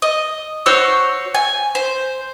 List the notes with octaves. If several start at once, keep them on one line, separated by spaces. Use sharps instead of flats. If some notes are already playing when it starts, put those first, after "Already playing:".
D#5
F#4 C5 C#5 E6
G#5
C5